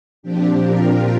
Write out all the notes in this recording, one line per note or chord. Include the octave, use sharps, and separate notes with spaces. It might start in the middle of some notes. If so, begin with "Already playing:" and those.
A#2 F3 C4 D4 G4
F4 A#4